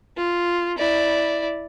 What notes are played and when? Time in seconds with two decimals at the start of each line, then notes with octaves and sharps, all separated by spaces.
0.16 F4
0.78 E4 D5